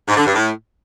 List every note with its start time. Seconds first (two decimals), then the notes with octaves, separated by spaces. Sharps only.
0.08 G#2
0.17 D3
0.26 G2
0.35 A2